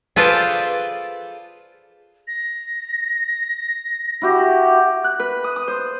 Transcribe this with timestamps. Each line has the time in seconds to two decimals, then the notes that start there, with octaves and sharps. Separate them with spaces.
0.16 F4 G#4 A4 B4 C5 D5
2.28 A#6
4.22 E4 F#4 G4
5.04 F#6
5.20 B4
5.44 D#6
5.56 D#6
5.68 C5